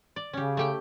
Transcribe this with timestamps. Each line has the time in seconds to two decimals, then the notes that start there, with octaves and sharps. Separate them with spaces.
0.16 D5
0.33 C#3 C#4 G4
0.57 A3 G4 G5